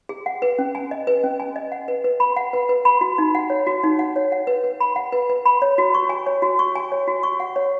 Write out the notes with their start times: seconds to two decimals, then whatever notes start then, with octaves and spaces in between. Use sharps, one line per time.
0.09 G#4
0.26 F#5
0.42 B4
0.59 C#4
0.75 G#5
0.91 D#5
1.07 B4
1.24 C#4
1.40 G#5
1.56 D#5
1.72 F#5
1.88 B4
2.04 B4
2.20 B5
2.37 F#5
2.53 B4
2.69 B4
2.85 B5
3.01 F#4
3.18 D#4
3.35 F#5
3.50 C#5
3.67 F#4
3.83 D#4
3.99 F#5
4.16 C#5
4.32 F#5
4.47 B4
4.64 B4
4.80 B5
4.96 F#5
5.12 B4
5.29 B4
5.45 B5
5.62 C#5
5.78 F#4
5.94 C#6
6.09 G#5
6.26 C#5
6.42 F#4
6.59 C#6
6.75 G#5
6.92 C#5
7.08 F#4
7.23 C#6
7.40 F#5
7.56 C#5